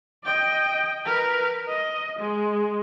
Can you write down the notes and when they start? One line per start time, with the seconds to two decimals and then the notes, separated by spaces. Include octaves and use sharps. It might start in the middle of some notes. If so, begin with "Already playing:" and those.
0.24 D#5 G5
1.05 A#4 B4
1.69 D#5
2.19 G#3